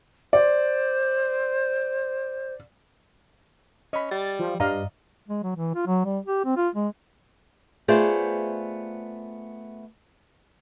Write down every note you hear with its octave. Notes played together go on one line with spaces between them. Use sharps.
C5 D5
C#4 D#5 B5
G3 A6
F3
G2 D5 D#5 F5 A#5
G#3
F#3
E3
F4
F#3
G3
G4
C4
F4
G#3
A3 B3 F4 G#4 C5 D5